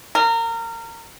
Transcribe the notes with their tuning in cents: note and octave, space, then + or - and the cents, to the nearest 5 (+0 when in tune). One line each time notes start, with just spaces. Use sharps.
A#4 -25